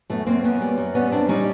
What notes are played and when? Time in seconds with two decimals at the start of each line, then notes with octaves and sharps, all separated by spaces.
0.10 F#2 A3 B3
0.26 F#2 A#3 C4
0.44 F#2 B3 C#4
0.61 G3
0.78 F#2
0.94 G3 B3 C#4
1.12 F#2 C4 D4
1.29 G3 C#4 D#4